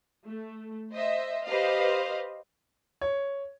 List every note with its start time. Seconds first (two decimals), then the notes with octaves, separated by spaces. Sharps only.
0.24 A3
0.91 C5 D#5 E5
1.46 G4 B4 C5 D#5 F5
3.01 C#5